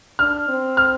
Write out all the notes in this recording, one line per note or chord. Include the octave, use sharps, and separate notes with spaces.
D4 F6
C4
F6